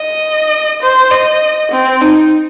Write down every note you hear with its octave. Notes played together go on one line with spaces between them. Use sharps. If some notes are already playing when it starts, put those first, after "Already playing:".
Already playing: D#5
C5
D#5
C4
D#4